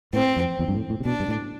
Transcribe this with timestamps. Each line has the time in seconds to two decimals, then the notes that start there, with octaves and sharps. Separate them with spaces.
0.13 A2 C4
0.37 F2
0.59 E2
0.68 G2
0.75 A2
0.90 A2
1.00 C3
1.05 B2 D4
1.20 G2
1.28 A2